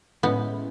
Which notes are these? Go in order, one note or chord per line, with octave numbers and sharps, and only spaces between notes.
A2 G#3 B3 C#4 E4